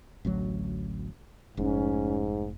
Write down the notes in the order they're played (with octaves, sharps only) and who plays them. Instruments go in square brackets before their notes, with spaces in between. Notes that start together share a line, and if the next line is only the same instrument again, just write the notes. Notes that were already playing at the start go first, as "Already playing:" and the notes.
[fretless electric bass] A1 D2 F#3
[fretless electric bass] F1 [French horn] G#2 [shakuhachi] C#4